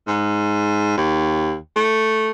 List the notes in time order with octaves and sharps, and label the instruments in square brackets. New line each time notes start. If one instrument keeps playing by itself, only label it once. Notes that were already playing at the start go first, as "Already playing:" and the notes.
[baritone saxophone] G#2
D#2
A3